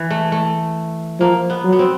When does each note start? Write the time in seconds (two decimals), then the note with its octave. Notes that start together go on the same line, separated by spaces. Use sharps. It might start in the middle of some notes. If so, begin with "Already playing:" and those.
Already playing: E3
0.10 A3
0.32 A3
1.20 F3 A#3
1.50 B3
1.65 F#3
1.73 B3
1.79 C4